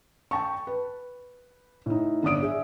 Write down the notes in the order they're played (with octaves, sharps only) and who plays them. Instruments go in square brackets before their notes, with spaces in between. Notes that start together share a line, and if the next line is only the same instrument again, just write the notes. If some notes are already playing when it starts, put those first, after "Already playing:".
[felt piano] G5 A5 C#6
B4
A2 D#4
G1 D4 D5 D#6 D7
G#4 E5